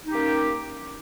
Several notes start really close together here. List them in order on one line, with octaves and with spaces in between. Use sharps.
D#4 C#4 G4 A#3